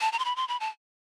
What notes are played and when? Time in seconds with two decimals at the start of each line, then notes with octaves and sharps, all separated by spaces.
0.01 A5
0.12 A#5
0.19 C6
0.25 B5
0.36 C6
0.48 B5
0.60 A5